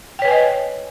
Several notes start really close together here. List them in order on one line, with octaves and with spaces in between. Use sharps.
G5 C#5 B4 G#5 D#5